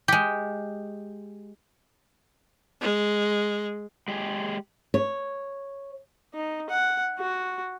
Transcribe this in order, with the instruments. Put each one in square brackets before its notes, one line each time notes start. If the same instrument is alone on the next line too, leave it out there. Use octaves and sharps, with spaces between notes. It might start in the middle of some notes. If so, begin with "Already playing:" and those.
[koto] G#3 G4
[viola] G#3
[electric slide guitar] G#3 G4 G#4
[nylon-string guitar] C#5
[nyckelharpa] D#4
F#5
F#4